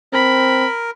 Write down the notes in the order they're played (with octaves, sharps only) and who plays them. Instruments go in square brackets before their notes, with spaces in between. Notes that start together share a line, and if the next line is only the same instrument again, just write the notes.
[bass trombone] C4 [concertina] A#4 [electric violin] B5